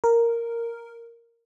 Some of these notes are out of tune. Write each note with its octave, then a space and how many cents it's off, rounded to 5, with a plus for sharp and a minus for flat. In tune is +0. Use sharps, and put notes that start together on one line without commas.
A#4 -5